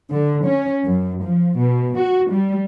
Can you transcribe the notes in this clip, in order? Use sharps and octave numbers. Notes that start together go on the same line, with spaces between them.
D3
C#4
F#2
F3
B2
F#4
G3